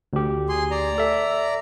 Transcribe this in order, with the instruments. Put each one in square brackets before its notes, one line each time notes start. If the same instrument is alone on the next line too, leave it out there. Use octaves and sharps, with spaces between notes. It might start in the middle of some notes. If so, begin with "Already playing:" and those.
[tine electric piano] D2 G4
[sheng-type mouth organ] G#4 C6
D5 A#5
[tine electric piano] A4 E5